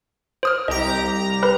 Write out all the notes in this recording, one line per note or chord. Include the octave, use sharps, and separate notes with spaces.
C5 D#6 F6
C2 G4 D#5 A#5
A#4 B4 B5